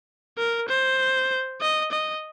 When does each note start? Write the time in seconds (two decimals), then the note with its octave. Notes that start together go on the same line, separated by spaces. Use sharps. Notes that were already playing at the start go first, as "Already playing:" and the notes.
0.38 A#4
0.69 C5
1.61 D#5
1.92 D#5